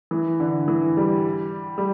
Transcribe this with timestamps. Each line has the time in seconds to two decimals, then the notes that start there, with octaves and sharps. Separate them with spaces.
0.11 E3
0.40 D3
0.68 E3
0.97 G3
1.78 G3